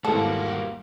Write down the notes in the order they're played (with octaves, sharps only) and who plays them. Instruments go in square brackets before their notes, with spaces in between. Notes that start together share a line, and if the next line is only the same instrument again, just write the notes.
[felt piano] G#1 E2 G#3 [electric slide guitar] G3 A#3 [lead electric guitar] F#4 [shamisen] A4